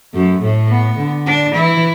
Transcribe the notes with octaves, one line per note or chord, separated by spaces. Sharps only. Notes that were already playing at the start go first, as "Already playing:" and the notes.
F#2 A3
A2 A3
B3
D3
D4
E3 E4